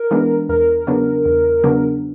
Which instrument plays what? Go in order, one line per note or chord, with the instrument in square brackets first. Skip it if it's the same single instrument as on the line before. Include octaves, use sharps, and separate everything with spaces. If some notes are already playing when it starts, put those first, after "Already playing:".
Already playing: [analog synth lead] A#4
[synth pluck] E3 G#3 B3 D4
[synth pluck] E2 [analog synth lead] A#4
[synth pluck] C#3 F#3 B3 D4
E2
C#3 F#3 B3 D4